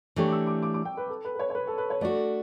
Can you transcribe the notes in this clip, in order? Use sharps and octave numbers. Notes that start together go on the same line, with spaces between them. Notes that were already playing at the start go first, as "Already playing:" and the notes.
E3 A3 D4 G4 C#5 C#6
D6
E6
D6
D6
D6
G5
B4
A4
B4
B4
C#5
C#5
B4
A4
B4
C#5
A3 D4 F#4 D5